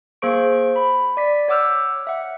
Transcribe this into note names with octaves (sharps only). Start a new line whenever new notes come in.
A#3 G#4 C5 C#6 D7
B5
D5 B6
C#5 F#5 D6 E6 F6 G6
E5 F#5